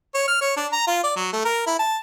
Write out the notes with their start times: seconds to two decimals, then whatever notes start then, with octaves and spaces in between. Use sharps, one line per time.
0.15 C#5
0.28 F6
0.41 C#5
0.56 D4
0.72 A#5
0.87 F4
1.04 D5
1.16 F#3
1.33 A3
1.45 A#4
1.67 E4
1.79 A5